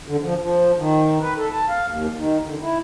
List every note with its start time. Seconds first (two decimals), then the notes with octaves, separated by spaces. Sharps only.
0.08 D3
0.23 F3
0.41 F3
0.77 D#3
1.21 B4
1.37 A4
1.52 A5
1.69 F5
1.86 D#2
2.16 D#3
2.44 D3
2.61 E4